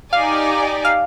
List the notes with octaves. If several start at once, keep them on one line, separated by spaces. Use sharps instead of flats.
D#4 G4 D5 F5 G#5
F5